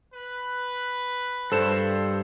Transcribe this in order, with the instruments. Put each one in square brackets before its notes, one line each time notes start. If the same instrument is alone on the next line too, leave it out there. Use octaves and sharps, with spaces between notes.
[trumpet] B4
[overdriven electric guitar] G2 [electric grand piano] A4 C5 E7